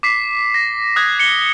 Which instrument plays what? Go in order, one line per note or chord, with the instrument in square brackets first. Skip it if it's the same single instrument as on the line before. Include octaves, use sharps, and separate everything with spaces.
[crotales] D6 B6 C7
A#6
D#6 F#6 G#6
C#7 G7